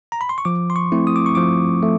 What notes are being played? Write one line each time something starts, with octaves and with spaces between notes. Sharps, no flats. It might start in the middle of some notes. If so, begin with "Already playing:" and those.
A#5
B5
C6
C#6
F3 D6
C6
C#6
A3 C4 E4
D#6
D6
C#6
F3 D6
A3